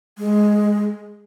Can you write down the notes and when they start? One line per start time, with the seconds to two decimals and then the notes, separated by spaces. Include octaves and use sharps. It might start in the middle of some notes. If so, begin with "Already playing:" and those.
0.18 G#3